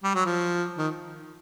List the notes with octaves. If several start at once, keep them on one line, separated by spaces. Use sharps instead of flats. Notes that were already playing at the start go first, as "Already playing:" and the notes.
G3
F#3
F3
D#3